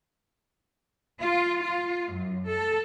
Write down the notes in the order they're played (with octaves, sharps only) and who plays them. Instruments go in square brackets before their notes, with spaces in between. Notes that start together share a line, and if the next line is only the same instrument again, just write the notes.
[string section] F4
F4
F#2
A4